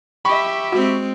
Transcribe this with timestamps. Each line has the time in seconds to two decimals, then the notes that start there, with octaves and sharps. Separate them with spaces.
0.25 G4 E5 B5 C#6
0.72 G#3 C4 F#4